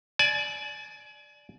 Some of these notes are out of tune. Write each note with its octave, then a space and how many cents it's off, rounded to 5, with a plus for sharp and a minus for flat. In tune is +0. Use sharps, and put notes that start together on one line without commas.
D5 +0 G#5 +35